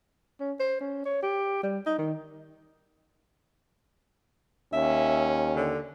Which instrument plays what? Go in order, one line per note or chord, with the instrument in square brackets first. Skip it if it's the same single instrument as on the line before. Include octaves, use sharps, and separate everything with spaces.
[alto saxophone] C#4
C5
C#4
C#5
G4
G3
D#4
D#3
[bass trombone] D#2 [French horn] C#4 [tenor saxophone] E5
[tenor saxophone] D3